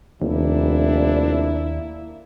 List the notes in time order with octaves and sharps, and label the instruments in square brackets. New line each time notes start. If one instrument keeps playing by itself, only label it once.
[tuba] F1 [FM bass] D#2 [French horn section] A#3 E4 [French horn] D4